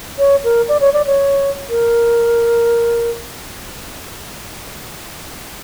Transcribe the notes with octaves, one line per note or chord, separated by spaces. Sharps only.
C#5
A#4
D5
C#5
D5
C#5
A#4